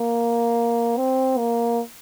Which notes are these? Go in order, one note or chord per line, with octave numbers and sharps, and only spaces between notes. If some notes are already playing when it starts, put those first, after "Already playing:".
Already playing: A#3
C4
A#3